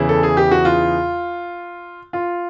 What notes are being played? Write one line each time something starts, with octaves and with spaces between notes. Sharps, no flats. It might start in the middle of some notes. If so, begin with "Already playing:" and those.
Already playing: E2 C#3 E3 E4
A4
G#4
G4
F#4
F4
F4